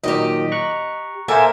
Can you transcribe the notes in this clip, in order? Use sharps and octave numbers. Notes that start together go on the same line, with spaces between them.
A#2 D#3 F#3 G4 D#5
A#5 C#6 F#6
A#3 A4 A#4 C5 E5 G#5